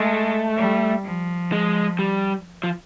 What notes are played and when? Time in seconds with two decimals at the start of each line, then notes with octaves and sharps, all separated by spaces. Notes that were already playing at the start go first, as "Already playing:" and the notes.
Already playing: G#3 A3
0.57 G3
1.04 F3
1.52 G#3
1.99 G3
2.63 F3